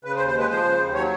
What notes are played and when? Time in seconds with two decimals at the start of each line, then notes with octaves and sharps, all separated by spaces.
0.04 C#3 B4
0.16 C5
0.20 D#2
0.27 C5
0.34 G#3 B4
0.50 F3 C5
0.65 C#3
0.80 D#2
0.95 F#3 C#5